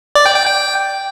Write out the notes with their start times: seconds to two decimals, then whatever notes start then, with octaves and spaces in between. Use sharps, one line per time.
0.15 D5
0.26 G5
0.36 G5
0.46 G5